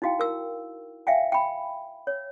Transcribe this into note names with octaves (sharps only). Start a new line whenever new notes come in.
D#4 E4 F#4 F5 G5
A#4 E6
E5 F5 G5 G#5
G5 B5
C#5